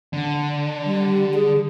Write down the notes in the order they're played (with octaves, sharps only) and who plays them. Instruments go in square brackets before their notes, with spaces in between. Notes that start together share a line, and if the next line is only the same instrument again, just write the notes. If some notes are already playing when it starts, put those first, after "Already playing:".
[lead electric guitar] D3
[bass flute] G3
G#4